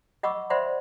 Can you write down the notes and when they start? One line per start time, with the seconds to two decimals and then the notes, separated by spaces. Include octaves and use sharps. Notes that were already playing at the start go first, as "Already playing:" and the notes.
0.23 D#5 F#5 B5 C#6 D6 E6
0.50 C5 D5 E5 F#5 B5 C6